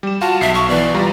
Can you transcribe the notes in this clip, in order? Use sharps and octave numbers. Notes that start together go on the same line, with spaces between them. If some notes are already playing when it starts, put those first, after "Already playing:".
G3 E7
F4 F#4 F5 A5
B1 E5 C7
C#6
E3 B3 D5
G3 F4 A#5